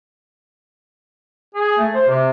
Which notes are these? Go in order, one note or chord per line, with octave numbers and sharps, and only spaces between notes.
G#4
A3
C5
C3